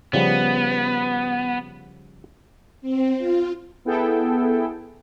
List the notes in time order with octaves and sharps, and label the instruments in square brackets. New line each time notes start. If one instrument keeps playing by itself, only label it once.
[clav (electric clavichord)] C#3 F3 G3 [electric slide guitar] B3
[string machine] C4
F4
[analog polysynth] B3 E4 G#4 A4 G5